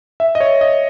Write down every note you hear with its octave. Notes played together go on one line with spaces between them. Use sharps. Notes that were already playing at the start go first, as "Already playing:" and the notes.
E5
D#5
C#5
D#5